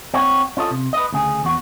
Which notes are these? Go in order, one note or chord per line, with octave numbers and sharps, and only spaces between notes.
C4 F#4 C#5
C#4 F4 A4 D#5
C3
B4 D#5
D2 C#3 G#4
E2 F#4